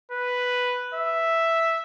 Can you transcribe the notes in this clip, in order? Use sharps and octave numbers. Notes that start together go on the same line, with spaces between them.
B4
E5